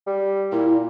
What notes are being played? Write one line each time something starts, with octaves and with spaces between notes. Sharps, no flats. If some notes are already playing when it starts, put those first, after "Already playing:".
G3
A#2 E4